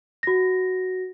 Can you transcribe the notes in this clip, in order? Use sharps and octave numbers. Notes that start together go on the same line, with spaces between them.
F#4 A#6